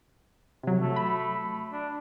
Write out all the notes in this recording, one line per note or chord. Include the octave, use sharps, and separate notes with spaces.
C3 F#3
A3
B5
D4